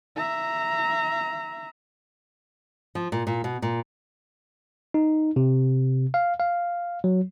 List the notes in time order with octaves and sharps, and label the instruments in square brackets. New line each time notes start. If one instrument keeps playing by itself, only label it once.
[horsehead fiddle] E5 A#5
[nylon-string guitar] F3
A#2
A#2
B2
A#2
[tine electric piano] D#4
C3
F5
F5
F#3